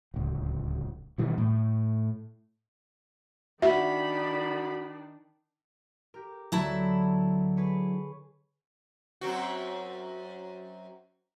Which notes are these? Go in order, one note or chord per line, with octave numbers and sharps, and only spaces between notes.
D1 C#2
B2 D#3 E3 G3
A2
D#3 D4 F#4 D5 E5 B5
G4 A#4
D2 D3 F#3 B3 E4 A5
G#4 B4 C#5
F#2 C4 F#4